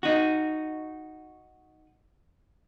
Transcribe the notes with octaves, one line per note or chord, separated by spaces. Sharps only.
D#4 F#4